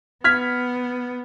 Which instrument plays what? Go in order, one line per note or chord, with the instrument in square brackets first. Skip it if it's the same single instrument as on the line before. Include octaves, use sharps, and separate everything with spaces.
[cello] B3 [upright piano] F6 G#6 B6